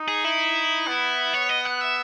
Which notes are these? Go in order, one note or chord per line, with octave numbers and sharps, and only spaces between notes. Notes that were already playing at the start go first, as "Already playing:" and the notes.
Already playing: D#4
G#4
E4
B3
C#5
D#5
F#5
E5